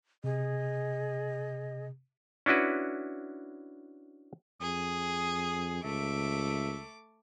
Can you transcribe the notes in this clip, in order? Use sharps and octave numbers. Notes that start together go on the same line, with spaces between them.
C3 G#4 D#5
C#4 D4 E4 F#4 B4
F2 G#4 D#6
C#2 A3 E5 D6